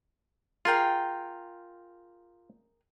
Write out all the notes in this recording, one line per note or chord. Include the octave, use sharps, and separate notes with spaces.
F4 G#4 A#4 G5